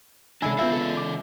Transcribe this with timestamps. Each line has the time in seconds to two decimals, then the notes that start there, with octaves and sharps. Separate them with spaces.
0.42 C3 G#3 D4 E4 A4 G#5
0.59 B3 E4 F4 A4 E5 F5
0.72 C#3 A4
0.97 D6